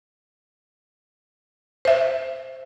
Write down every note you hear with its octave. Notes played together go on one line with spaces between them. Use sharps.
C5 E5